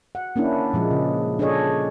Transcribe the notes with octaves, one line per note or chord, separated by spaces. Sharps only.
F#5
A#3 C#4 D4 E4
A#2 F3 G#3
C#3
D4 G#4 A4 C#5 D#5